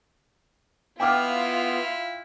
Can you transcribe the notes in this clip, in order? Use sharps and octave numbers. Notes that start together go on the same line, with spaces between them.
B3 E4 F4 G5 D6 F6